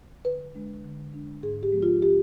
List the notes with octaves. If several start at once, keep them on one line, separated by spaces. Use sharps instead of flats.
D3 B4
G#3 D4
D3
G#3 D4
G#2 G#4
G4
F3 G#3 B3
F4
G4